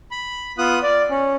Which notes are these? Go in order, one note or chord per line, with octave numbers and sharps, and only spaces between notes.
B5
B3 F4 D#6 F#6
D5
C#4